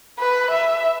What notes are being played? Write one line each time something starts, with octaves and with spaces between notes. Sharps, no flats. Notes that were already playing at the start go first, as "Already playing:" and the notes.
B4
E5